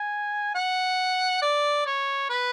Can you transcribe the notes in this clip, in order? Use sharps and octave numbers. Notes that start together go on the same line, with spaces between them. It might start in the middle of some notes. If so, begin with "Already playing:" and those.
Already playing: G#5
F#5
D5
C#5
B4